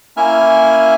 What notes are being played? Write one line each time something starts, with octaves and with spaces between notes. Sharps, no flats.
A#3 C#4 E4 E5 G#5 F6